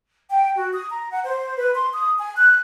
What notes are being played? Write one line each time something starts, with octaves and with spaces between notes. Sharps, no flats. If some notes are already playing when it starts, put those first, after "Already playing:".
G5
F#4
D#6
A#5
F#5
C5
B4
C6
D#6
G#5
F#6